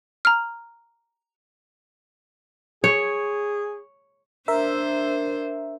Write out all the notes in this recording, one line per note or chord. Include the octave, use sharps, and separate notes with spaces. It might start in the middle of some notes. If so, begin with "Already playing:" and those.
A#5 F6
G#4 C#5
D4 A#4 C5 E5